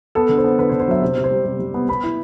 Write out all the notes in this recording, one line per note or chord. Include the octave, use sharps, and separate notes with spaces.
B3 A4
D3
C5
B3
D3 B4
C5
D3
C5
F#3 E5
C3 C5
C3
C5
G3
C3
G3
B3
B3 B5
E4